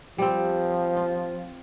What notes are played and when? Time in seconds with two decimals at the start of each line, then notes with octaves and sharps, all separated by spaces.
0.18 F3 G3 C4
0.96 F4